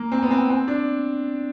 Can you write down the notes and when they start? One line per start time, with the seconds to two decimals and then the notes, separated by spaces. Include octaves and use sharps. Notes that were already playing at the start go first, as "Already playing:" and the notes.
Already playing: A#3
0.12 C4
0.23 B3
0.31 C4
0.50 C4
0.68 D4